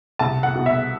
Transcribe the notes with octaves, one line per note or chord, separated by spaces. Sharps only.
C2 A5
F#5
B2
E5